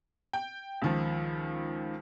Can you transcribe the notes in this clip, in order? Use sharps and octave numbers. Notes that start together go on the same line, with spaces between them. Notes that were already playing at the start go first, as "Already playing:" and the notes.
G5
C#2 D#3 F3